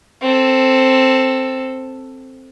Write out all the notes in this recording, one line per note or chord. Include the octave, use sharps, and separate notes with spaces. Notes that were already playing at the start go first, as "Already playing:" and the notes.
C4 A4